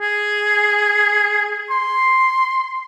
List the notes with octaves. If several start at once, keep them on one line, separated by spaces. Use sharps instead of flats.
G#4
C6